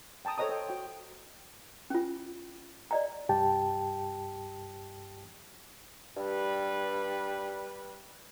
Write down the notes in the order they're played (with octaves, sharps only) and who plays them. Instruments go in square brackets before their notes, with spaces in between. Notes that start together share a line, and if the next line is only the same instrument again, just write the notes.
[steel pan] G5 A5 A#5 D#6
A4 C5 C#5 D#5 A#5 D#6
C5 G5
F#4 G5
[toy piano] C#4 F4
D5 D#5 A#5
[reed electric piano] C2 G2 G4 G5 A5
[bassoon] G2 [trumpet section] G3 B4